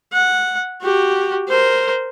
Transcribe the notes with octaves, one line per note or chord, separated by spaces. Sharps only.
F#5
F#4 G4
A#4 C5